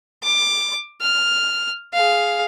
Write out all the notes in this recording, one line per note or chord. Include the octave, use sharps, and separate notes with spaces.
D6
F6
G#4 F5